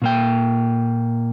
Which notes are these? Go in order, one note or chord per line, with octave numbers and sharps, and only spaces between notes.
A#2 A#3 G5